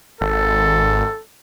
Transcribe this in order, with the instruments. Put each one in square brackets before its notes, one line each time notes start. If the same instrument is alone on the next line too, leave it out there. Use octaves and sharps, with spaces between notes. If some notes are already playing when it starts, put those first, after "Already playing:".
[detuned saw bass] G#1 [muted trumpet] A4